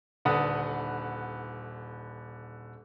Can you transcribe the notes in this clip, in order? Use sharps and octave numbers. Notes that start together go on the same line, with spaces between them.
D#1 D3 B4 F#5 D#6